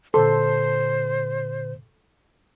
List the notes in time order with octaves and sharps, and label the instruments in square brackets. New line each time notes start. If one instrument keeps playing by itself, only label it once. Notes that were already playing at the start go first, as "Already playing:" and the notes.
[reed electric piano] A#2 D3 C6 [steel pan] A4 [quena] C5